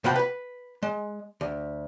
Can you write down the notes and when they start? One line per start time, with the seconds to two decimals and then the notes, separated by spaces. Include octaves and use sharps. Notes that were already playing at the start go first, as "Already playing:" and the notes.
0.04 C3 F3 F4 F#4 G5 B5
0.16 B4 B5
0.83 G#3
1.41 D2